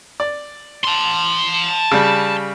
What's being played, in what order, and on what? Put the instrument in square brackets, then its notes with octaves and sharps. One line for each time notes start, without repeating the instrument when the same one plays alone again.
[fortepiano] D5
[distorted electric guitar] A5 C6
[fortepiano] C#3 G3